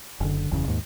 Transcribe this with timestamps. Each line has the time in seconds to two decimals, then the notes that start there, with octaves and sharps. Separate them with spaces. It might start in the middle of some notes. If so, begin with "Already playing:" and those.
0.20 F#1 D3
0.51 F#1 E2 A#2 C#3
0.68 D#2 G#2